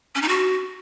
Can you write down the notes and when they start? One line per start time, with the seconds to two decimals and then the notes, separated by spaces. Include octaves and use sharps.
0.15 C#4
0.22 D#4
0.28 F#4